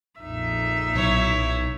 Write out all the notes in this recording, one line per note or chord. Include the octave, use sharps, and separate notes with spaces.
A#1 F2 A#2 D#4 E5
B1 E4 C#5